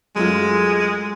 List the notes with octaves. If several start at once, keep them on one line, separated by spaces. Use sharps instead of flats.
F#2 G#3 A3 F4